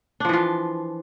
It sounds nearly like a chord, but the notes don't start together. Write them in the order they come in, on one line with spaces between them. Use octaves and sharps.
D4 F3 E3 F4